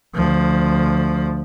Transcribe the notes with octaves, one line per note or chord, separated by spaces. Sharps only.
D2 F3